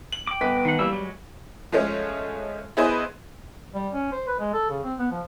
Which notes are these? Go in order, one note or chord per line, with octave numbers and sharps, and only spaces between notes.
F#7
G5 D6
G1 B3 B6
D#3 F#5
E3 G3 A#3 E6
F#3 G#3
F3 G#3 A3 C#4
B3 E4 G#4 B4 C5 D#5
G3
C#4
C5
B4
G#3
A4
C#3
C4
B3
F3